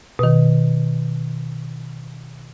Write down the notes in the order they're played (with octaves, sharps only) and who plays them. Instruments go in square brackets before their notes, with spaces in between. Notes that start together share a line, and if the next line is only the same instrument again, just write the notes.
[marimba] B2 D#3